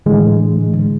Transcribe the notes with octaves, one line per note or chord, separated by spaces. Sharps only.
A2 D3 E3 G#3